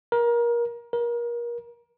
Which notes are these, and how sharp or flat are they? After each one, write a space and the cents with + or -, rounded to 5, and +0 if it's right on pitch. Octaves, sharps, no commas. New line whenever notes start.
A#4 +25
A#4 +30